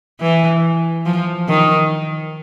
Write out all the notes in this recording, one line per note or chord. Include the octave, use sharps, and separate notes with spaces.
E3
F3
D#3